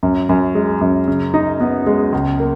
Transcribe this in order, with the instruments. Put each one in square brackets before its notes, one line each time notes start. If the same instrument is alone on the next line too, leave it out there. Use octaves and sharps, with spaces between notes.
[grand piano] F#2
F#2
G#3
F#2
C#3
D#4
B3
G#3
C#2
A#3